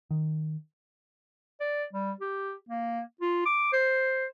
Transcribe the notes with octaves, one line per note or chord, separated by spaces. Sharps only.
D#3
D5
G3
G4
A#3
F4
D6
C5